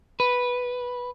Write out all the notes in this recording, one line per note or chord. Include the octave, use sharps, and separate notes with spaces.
B4